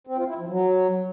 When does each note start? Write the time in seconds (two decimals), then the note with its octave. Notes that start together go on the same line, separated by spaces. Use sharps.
0.07 C4
0.18 F4
0.28 E4
0.38 F3
0.49 F#3